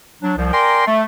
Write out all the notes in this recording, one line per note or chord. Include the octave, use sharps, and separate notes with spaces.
F#3 D4
C2 F3
A#4 D5 G5 G#5 A#5 C6
A3